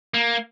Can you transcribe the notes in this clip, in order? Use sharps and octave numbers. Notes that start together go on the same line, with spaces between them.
A#3